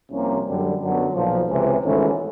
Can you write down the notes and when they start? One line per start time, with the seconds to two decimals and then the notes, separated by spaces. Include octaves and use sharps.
0.11 C2 C3 F3 A#3 C#4
0.45 F#2 D3 G3
0.80 F#2 D3 F#3 B3
1.14 B1 A#2 F3
1.49 C#2 C3 E3
1.82 G#1 G#2 E3 A3 C#4